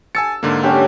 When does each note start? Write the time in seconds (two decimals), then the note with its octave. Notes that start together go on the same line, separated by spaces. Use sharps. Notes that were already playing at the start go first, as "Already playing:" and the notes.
0.15 G#5 A5 E6 C#7
0.43 G#2 D3 A#3
0.63 C#4 D4 G4